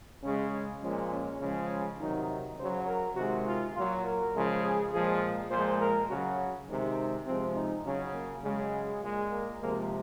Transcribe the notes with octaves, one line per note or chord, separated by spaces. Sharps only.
C#3 G#3 C#4
A#2 F3 G#3 C#4
C#4
C#3 F3 G#3
C3 D#3 F#3 D#4
D#4
C#3 F#3 C5
A#4
C3 D#3 G#3 F#4
F4
A#2 F#3 F4
A#4
C#3 F3 G#3
G#4
A#2 F3 G#3 G#4
A#2 F3 G#3 C5
A#4
C#3 F#3 F#4
C3 D#3 G#3 D#4
C3 F3 G#3 C4
D#4
C#3 F#3 C#4
A#3
C#3 F#3 G#3
A#2 G#3
A#3
C3 F3 G#3 A#3